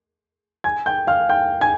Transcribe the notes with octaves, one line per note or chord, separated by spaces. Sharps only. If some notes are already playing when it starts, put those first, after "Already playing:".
G#5 G#6
G5 G6
F5 F6
G5 G6
G#5 G#6